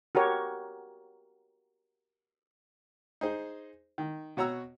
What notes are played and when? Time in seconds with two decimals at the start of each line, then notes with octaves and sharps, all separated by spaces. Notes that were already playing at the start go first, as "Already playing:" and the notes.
0.15 F#4 G4 A#4 C#5
3.21 D#4 G#4 C5
3.98 D#3
4.37 B2 F#4 C#5 A#5 E6